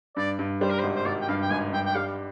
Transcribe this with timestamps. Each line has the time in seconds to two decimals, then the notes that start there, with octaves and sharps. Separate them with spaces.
0.17 G2 D5
0.39 G2
0.61 G3 C5
0.70 A#4
0.79 C5
0.83 G#1
0.95 C5
1.06 G#1 D5
1.21 G5
1.28 G2 F5
1.41 G5
1.50 G#1 G#5
1.73 G2 G5
1.85 G5
1.95 G3 F5